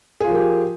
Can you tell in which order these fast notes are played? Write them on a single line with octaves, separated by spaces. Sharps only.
G#4 F4 F3 A#4 G4